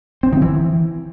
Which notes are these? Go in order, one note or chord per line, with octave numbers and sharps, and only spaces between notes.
C4
D#3
E3